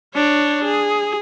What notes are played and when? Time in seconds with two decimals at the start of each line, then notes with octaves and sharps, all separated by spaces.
0.15 D4 C#5
0.65 G#4